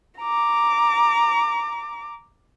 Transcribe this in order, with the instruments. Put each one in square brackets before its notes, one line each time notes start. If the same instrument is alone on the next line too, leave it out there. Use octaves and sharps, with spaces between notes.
[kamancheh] A#5 D6